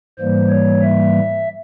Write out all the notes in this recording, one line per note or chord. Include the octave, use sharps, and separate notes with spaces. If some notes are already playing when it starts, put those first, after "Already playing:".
G#2 E3 G3 A#3 C5
C#5
E5